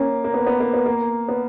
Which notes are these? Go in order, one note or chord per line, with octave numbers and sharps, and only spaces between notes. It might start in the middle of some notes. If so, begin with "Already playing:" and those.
Already playing: A#3 C#4
A#3
B3
B3
A#3
B3
A#3
B3